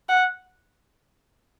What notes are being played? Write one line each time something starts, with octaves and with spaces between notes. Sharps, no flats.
F#5